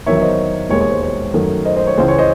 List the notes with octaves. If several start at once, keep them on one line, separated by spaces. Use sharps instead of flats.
E2 D#3 F#3 C#5 E5
E5
C5 D#5
E1 D#2 D#3 G#3 C#5
C#5
C5
C#5
F#2 D#3 A3
C5 D#5
C5 D#5
C#5
C#2 C#3 E3 G#3 C5
C#5
C5 D#5